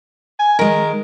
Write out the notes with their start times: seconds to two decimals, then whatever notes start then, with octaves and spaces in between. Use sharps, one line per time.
0.39 G#5
0.59 D#3 G#3 A#4